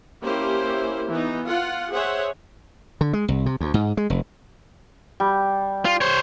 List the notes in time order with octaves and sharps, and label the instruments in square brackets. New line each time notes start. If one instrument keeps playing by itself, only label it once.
[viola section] A#3 C#4 E4 G4 C5
E3 B3 D#4
F4 F#5
G#4 C5 C#5 E5 F#5
[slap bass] D3
G#3
C2
C3
D2
G#2
G#3
F1
[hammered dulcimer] G3
[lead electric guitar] F4
C5 C#5